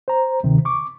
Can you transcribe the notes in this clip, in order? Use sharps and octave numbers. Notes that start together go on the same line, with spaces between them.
C5 A#5
D2 C3 D#3
C#6 D6